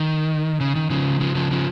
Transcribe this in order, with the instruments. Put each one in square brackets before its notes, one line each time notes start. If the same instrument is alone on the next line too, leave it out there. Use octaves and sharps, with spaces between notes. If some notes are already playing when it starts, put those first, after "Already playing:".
Already playing: [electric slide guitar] D#3
C#3
D#3
C#3 F3
C#3 F3
C#3 F3
C#3 F3